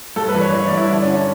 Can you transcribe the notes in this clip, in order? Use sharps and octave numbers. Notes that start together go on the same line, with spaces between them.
G2 A4
B4
E3
C#5
E3
C#5
D5
G2
E4
D3 D4
C#4
D3
D4